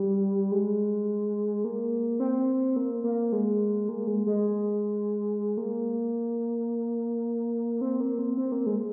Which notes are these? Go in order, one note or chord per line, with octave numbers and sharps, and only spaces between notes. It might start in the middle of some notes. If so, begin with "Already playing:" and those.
Already playing: G3
G#3
A#3
C4
A#3
A#3
G#3
A#3
G#3
G#3
A#3
C4
A#3
C4
C4
A#3
G#3